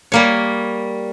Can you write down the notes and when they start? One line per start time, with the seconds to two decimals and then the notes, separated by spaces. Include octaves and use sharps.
0.12 G3 A#3 C#5